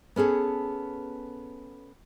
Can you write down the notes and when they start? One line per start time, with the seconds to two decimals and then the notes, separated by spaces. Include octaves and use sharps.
0.16 B3 C#4 G#4 A4